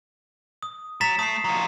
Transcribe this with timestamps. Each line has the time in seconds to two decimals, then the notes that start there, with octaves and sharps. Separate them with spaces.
0.63 D#6
1.01 F#3 A6 B6 E7
1.19 A3 D#6 C7
1.44 F3 F#3